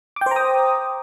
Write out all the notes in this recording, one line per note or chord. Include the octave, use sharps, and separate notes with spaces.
C5 G5 A#5 D6 D#6